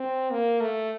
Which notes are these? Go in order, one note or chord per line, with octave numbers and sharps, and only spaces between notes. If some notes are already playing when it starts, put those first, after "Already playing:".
Already playing: C4
A#3
A3